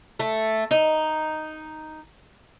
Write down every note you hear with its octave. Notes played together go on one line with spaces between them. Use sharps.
A3
D#4